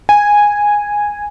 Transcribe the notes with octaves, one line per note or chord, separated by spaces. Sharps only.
G#5